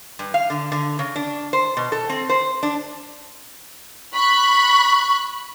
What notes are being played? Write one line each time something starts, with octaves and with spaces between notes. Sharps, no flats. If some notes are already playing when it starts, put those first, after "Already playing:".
G2
F5
D3
D3
C#3
D4
C5
B2
A4
C4
C5
D4
B5 C#6 F#6